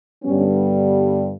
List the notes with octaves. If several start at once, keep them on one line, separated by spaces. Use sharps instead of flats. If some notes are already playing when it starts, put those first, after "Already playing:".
G2 D3 G3 B3 C#4